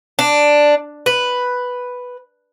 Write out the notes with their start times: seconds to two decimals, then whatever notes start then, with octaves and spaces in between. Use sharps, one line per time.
0.19 D4
1.06 B4